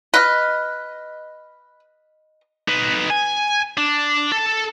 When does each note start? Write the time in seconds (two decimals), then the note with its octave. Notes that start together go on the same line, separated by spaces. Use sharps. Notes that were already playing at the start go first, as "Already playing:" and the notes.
0.14 B4 D#5 F6
2.68 D#4 B4
3.10 G#5
3.78 D4
4.32 A4